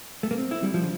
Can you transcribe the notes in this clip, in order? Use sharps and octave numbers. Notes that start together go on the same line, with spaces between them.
A3
A#3
C4
E4
G3
F3
D3